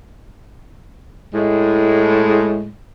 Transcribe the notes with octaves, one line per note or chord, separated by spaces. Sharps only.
A2 G#3